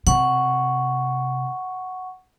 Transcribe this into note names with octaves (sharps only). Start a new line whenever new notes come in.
C3 F#5 C#6